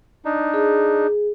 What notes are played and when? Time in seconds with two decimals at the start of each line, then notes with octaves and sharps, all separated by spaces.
0.25 D4 D#4
0.54 G#4